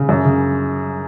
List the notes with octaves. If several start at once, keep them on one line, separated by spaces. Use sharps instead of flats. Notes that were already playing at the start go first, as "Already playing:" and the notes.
Already playing: C#3
F#2
C#3